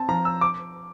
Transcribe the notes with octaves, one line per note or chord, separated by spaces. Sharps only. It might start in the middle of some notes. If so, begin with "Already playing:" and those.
Already playing: C4 A5
F3 A#5
E6
D6